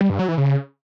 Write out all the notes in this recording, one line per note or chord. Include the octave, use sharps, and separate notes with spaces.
G3
G2
F#3
E3
C#3